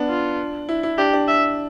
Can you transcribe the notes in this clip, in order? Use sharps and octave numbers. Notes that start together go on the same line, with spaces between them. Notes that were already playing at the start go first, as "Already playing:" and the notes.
Already playing: B3 D4
F4
E4
E4
D4 G4
D4
E5